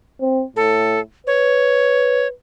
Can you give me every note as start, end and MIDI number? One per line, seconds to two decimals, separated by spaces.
0.21 0.43 60
0.56 1.00 45
0.56 1.00 69
1.27 2.30 71
1.27 2.27 73